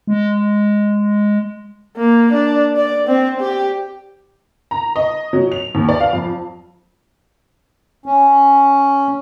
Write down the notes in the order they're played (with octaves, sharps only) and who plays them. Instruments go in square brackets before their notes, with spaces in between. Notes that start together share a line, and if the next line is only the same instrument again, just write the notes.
[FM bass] G#3
[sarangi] A#3
D4
D5
C4
G4
[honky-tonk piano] A#5
D#5
F#3
F7
D#2
D5
F5
F2
[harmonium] C#4